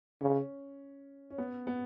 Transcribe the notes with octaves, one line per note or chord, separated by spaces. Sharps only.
C#3 C#4
C#4
B3
B3